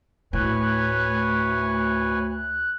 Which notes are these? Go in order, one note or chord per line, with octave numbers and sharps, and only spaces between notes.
D2 A2 B4 C#5 G#5 F#6